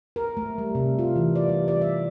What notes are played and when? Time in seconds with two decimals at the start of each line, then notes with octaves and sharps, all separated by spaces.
0.16 A#4
0.37 A3
0.58 G3
0.75 C3
0.99 F4
1.16 E3
1.35 D5
1.49 G3
1.68 D5
1.81 E5